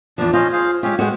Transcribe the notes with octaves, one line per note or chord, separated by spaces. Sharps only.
E2 F3 D4
C#4 F4 C5 D#5
G#4 C5 F5
G#3 C#4 F4 G4
G#3 B3 F#4 G#4 C5